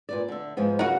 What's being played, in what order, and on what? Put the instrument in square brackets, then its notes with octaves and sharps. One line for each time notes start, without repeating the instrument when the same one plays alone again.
[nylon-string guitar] A#2 B4 D5
D3 E5
G#2 F3 B3
[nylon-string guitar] C#3 A#4 [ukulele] F#4 F#5